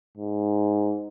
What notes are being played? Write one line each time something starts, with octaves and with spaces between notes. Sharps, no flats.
G#2